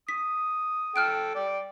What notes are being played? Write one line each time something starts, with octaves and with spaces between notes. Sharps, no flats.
D#6 B6
A4 G5 F6 F#6 D7
D5 G5